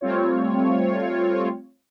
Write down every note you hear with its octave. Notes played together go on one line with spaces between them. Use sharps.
G3 A3 C4 F4 C#5